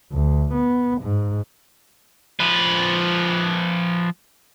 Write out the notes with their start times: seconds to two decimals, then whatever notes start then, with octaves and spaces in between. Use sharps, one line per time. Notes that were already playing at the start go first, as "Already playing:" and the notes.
0.12 D2
0.54 B3
1.02 G#2
2.40 F3 B4